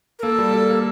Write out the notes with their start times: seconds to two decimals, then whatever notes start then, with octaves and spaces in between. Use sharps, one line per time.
0.19 A#4
0.23 A#3 A4
0.38 G3
0.54 G3
0.70 A#3